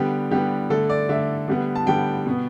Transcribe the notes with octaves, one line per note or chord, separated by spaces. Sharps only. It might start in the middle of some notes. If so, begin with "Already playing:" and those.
Already playing: D3 G3 B3 G4
D3 G3 B3 G4
D3 A3 A4
D5
D3 A3 E5
D3 G3 B3
A5
D3 G3 B3 G5
B2 B3